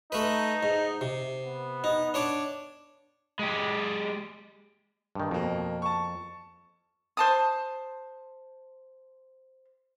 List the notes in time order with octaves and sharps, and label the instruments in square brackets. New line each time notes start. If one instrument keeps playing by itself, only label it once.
[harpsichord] A3 B4 [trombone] D#4
[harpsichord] G#2
C3
[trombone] B3
[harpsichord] D#4
D4 C#5 D6
[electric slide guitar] G#3 G4
[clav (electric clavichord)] G2 D#3
[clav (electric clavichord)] F2 [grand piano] B2 A#3
[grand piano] A5 C#6
[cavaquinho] C5 A5 D#6